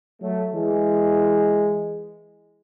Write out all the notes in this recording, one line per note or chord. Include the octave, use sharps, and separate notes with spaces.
F#3 A3
E3 G#3